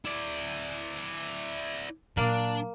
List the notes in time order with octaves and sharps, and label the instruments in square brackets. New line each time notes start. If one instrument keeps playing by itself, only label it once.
[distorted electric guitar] E4 D5
[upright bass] A#2 F#3 [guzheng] A#3 [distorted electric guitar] D4